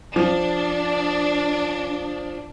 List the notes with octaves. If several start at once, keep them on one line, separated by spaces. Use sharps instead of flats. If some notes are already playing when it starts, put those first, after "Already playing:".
F3 D4